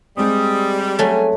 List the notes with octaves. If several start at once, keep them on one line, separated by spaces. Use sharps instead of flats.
G3 G#3 C4 D#6
F#3 A3 G#5